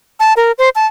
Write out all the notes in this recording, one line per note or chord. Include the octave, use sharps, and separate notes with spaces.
A5
A#4
C5
A5